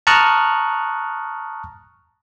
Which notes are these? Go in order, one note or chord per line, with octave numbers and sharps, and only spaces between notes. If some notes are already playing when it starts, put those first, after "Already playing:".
A5 A#5 C#6 D#6 F6 F#6